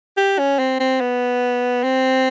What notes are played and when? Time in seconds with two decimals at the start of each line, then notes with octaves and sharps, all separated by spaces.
0.17 G4
0.39 C#4
0.59 C4
0.80 C4
1.01 B3
1.83 C4